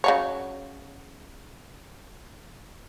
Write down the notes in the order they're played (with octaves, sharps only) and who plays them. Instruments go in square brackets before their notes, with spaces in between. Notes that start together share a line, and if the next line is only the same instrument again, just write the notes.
[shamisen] C#3 F#3 C#5